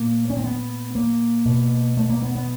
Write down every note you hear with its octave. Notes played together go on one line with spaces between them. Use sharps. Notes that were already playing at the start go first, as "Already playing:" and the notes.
Already playing: A#2 A#3
C#4
C4
B3
A#3
B2
A3
A#3
B3
B3